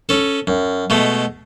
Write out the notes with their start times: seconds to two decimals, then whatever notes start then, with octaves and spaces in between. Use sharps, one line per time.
0.09 C#4 A4
0.47 F#2
0.90 B2 G#3 A3